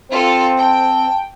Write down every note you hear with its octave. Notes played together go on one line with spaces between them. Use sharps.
C4 F4 A4 C5
G5 A5